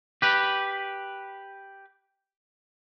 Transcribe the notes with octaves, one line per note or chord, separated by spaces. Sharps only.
G4 B4